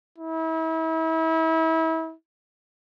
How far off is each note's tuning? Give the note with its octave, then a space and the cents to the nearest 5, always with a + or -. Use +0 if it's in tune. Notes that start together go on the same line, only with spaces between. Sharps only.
E4 -35